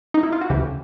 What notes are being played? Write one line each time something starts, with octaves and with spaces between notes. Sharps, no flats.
D#4
E4
F4
F#4
D2 C#3 E3 G4